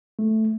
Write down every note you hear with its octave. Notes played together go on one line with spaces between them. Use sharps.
A3